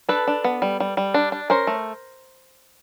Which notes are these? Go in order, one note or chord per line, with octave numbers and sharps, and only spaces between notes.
D4 A4 B4
D4
B3
G3
G3
G3
D4
D4
C#4 A#4 C5
A3